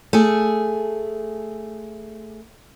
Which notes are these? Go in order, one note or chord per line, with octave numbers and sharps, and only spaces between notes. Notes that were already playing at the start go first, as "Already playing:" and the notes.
A3 G#4